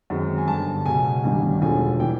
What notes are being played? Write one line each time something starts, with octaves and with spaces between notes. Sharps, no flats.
F#2 D#3 G#3 C4
G#5
G1 G2 D3 A5
C#2 B2 F#3 G#5
A1 G2 D#3 G3
E1 D2 D3 F3 G#3 G#5
E3 G3 G5